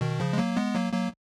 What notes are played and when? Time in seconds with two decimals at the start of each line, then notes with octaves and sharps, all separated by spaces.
0.01 B2 D#3
0.20 C#3 F3
0.33 G#3
0.38 F#3 A#3
0.57 G#3 B3
0.75 F#3 A#3
0.93 F#3 A#3